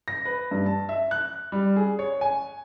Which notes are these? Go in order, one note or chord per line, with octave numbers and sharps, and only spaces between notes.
A#6
B4
G2
A5
E5
F#6
G3
G#4
C#5
G#5